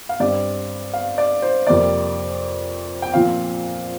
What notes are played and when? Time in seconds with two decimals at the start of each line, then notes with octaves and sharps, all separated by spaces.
0.09 F5
0.20 G2 G3 C4 D5
0.94 F5
1.18 D5
1.42 C5
1.67 F2 C3 G3 A#3 D5
3.02 G5
3.13 A#2 F3 C4 F5